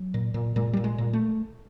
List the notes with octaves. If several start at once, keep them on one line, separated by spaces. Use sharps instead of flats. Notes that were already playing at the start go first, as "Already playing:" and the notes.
Already playing: F#3
A#2
A#2
A#2 G#3
A#2 G3
G#3
A#2
A3